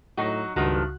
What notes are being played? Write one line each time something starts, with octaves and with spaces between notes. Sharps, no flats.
A2 F#3 D#4 F#4
C#2 G2 D#3 F3 A3 F#4 F#6